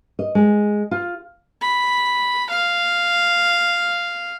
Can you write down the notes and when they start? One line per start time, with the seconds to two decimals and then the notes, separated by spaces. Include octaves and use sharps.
0.19 D#5
0.35 G#3
0.91 F4
1.62 B5
2.50 F5